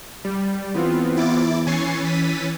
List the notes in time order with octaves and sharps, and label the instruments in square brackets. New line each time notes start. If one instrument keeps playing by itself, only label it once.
[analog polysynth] G3
[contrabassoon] E2 [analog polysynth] B3 C4 F4
[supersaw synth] E4 D6 A6
[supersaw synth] E3 C#4 A6 [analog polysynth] G#5 C#6 C7
[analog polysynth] B6 D#7